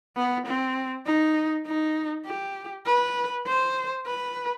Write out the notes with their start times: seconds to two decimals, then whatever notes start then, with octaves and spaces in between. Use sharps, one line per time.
0.17 B3
0.47 C4
1.06 D#4
1.67 D#4
2.26 G4
2.86 B4
3.46 C5
4.07 B4